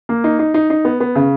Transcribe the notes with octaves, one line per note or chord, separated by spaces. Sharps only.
A#3
D#4
D#4
D#4
D#4
B3
B3
C#3